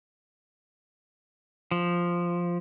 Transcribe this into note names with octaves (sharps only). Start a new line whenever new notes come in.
F3